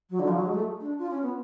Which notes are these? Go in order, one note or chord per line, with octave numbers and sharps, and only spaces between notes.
F#3
D3
F3
F#3
G#3
A3
D4
F4
C#4
B3